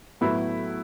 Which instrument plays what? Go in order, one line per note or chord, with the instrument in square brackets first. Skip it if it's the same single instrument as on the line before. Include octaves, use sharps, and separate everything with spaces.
[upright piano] A2 F#3 B3 E4